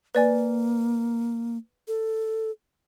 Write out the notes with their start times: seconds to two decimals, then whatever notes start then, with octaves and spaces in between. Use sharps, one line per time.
0.15 A#3 B4 D5 G#5
1.88 A4